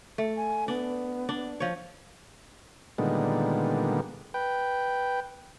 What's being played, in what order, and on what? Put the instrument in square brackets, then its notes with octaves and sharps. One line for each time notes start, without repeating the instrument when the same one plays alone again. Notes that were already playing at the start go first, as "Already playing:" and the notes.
[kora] A3
[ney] G#5
[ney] B3 [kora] D4
[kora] D4
F3 C#5
[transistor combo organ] A#2 D3 D#3 G3 G#3 B3
B4 G5